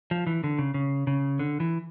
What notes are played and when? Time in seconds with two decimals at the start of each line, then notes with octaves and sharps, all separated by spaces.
0.11 F3
0.27 E3
0.44 D3
0.59 C#3
0.74 C#3
1.07 C#3
1.39 D3
1.60 E3